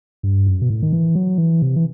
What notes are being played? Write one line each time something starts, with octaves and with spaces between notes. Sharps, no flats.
G2
F#2
B2
A2
D#3
E3
F#3
E3
C3
E3